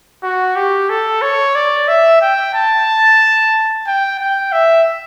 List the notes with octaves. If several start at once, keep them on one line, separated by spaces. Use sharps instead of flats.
F#4
G4
A4
C#5
D5
E5
G5
A5
G5
G5
E5